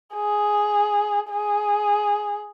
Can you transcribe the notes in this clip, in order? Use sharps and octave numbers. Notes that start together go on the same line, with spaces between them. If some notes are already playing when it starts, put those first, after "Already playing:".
G#4
G#4